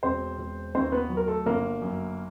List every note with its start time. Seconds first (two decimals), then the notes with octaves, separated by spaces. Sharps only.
0.03 E1 C4 C5
0.38 E1
0.75 D#2 C4 C5
0.92 B3 B4
1.09 F#3
1.17 A#4
1.27 A3 A4
1.46 G1 A#3 A#4
1.82 F#2